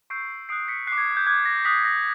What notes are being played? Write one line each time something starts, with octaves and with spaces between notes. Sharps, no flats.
C#6 E6 G6 C7 D7
D#6 F#6 C7 D7
B6 C#7
F#6 C7
D6
G#6
G6
D6 F#6 G#6
A#6
D#6 F#6 B6
A#6